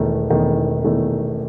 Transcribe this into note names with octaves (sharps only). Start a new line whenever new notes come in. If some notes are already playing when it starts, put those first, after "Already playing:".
Already playing: E1 E2 D#3 A3
E1 E2 D#3 A3
E1 E2 D#3 A3